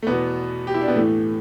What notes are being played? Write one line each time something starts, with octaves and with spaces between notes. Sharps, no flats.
A3
E2 B2 B3
G4
E4
D4
B3
A2 E3 A3